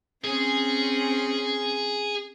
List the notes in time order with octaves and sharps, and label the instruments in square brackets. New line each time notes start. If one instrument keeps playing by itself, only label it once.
[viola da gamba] C4 C#4 [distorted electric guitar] G#4